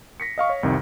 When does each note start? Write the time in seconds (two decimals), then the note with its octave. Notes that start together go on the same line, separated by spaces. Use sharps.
0.20 A#6 B6 C#7
0.38 D#5 F5 C#6
0.49 C#5
0.63 C2 F2 C3 D#3